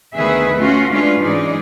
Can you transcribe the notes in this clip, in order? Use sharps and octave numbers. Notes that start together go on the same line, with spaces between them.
D2 D#3 B3 G#4 B4 E5
A3 C#4 F4 F#4
G#3 A3 C#4 D4 F4 B4
G#2 E3 F#3 D#4 G#4 D5